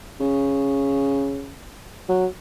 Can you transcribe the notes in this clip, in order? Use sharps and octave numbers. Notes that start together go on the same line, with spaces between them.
C#3
F#3